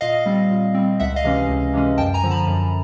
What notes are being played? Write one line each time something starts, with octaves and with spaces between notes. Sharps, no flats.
A#2 D#5 F5
G3 C4
A#2
G3 C4
C#2 E5 F#5
D#5 F5
C3 E3 G#3 C#4
C#2
C3 E3 G#3 C#4
F#2 G5 A5
G#5 A#5
D3 F3
A5 B5
F#2